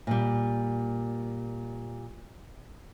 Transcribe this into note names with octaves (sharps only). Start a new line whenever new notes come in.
A#2 G3